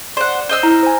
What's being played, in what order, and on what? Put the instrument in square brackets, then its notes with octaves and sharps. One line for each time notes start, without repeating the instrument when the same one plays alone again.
[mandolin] C5 F#5 [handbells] D5
[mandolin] C5 D#5 E6
[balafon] E4 [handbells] A#5 F6
[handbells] C5 G#5